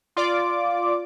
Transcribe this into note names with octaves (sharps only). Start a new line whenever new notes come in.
F4 D5 D6